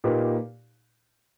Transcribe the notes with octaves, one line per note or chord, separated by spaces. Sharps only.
A#2 A#3 D#4 G4 B4